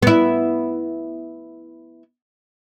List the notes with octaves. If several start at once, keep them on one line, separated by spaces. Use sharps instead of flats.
B3 E4